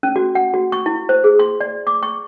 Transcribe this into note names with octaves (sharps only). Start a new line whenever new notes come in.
C#4
F#4
F#5
F#4
C#6
E4
C5
G#4
C6
D5
D6
C#6